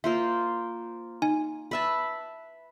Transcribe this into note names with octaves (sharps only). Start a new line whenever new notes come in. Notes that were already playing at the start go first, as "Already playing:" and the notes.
A#3 F4 C5 E5
D#4 G#5
B4 E5 A5